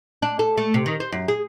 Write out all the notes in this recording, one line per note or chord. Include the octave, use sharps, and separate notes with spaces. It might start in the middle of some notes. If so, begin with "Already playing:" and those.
D4
A4
A3
C3
D#3
C5
F#2
G#4